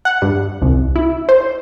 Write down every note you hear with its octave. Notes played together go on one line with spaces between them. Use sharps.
F#5
G2
C2
E4
C5